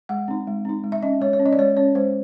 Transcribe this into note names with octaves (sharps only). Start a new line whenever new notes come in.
G#3 F#5
C4 D#4
G#3
C4 D#4
G#3
E5
C#4 D#5
G#3 C#5
C#5
C#4
D#5
D5
G#3 C#5
C#4 C#5
G#3 C5